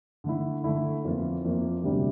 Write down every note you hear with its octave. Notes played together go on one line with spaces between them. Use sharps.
D3 A3 E4
D3 A3 E4
F2 E3 A#3 F4
F2 E3 A#3 F4
D2 C3 G3 D4